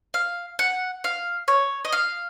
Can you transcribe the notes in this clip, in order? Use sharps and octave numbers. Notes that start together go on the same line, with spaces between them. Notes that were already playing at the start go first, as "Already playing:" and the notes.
F5
F#5
F5
C#5
D#5
F5